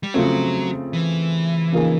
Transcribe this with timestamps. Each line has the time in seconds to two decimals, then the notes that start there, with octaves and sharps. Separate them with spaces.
0.03 G3
0.14 C#3 F3 F#3 A3 C4
0.93 E3
1.72 C#3 F3 A#3 D#4 G#4